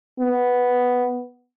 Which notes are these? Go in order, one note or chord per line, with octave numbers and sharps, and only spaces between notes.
B3